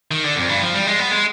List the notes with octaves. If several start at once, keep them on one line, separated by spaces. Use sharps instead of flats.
D#3
D3
F2
G2
F3
G3
G#3
B3
G#3